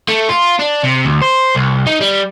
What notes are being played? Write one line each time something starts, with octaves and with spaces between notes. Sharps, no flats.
A3
F4
D4
C3
D2
C5
C2
D#4
G3